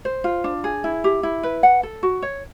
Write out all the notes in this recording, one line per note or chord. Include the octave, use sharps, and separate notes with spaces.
C5
F4
D4
G#4
E4
G4
E4
B4
F#5
A4
F#4
C#5